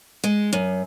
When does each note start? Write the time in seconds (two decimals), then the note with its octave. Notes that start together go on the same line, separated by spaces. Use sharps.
0.24 G#3
0.53 F#2